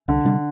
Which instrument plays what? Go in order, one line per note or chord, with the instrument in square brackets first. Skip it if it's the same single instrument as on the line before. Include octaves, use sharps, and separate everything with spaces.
[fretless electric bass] C2 [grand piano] D3
[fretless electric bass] C3 G3 D4